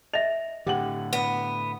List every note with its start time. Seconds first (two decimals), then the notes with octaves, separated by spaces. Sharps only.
0.14 D#5 E5 F7
0.66 A2 D3 G4 F#5 F#7
1.13 B3